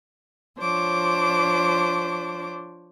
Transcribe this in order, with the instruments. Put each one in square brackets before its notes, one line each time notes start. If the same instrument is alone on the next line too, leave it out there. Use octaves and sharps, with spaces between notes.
[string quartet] F3 D4 C5 C#5 D6